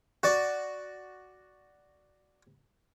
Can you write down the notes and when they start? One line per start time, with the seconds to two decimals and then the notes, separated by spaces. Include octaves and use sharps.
0.23 F#4 D5